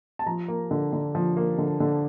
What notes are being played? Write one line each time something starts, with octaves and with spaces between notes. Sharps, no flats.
A5
F3 A#5
A#3
D3
D3
F3
A#3
D3
D3